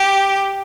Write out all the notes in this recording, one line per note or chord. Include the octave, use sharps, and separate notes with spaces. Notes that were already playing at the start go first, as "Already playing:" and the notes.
Already playing: G4